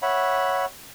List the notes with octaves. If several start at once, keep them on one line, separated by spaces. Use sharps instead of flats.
C#5 E5 F#5 B5